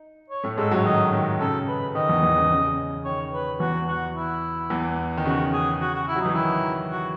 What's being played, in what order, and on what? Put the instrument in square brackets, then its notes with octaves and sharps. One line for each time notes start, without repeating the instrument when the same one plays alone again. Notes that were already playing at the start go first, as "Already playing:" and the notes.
Already playing: [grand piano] D#4
[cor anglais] C#5
[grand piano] A2 A3
[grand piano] G#2 G#3 [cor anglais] A4
[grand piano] F#2 F#3 [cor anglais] C#5
[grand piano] D#3 [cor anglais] D#5
[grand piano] D#3
[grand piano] C#3 [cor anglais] A4
[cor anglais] B4
[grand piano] D#3 [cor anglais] D#5
[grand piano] E2 E3
E2 E3
C#3
C#3
[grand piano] D#3 [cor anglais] C#5
[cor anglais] B4
[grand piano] E2 E3 [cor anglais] F#4
[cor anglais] F#4
E4
[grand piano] E2 E3
D#3
[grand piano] C#3 [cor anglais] F#4
[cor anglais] G#4
F#4
F#4
E4
[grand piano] F#3
[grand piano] E3 [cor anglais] D#4
[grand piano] D#3 [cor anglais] E4
[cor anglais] F#4